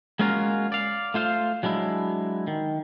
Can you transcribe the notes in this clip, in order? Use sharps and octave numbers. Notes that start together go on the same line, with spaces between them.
G#3 A#3 C#4 F4 F#4 A#4
D5 F5
A3 F4 C5 F5
F#3 G#3 D4 E4
D#3